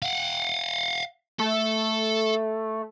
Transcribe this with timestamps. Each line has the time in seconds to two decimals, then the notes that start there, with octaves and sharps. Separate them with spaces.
0.02 F5 F#5
1.39 A3 A4